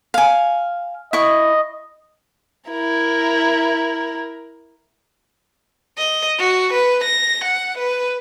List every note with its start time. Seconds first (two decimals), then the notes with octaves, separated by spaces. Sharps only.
0.14 F5 G#5
1.13 E4 D#5 C#6
2.70 E4 A#4
5.97 D#5
6.38 F#4
6.73 B4
7.04 A#6
7.44 F#5
7.78 B4